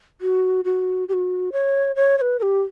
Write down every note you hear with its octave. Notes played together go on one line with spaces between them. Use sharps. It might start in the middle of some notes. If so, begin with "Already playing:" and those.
F#4
F#4
G4
F#4
C#5
C#5
C#5
B4
A#4
G4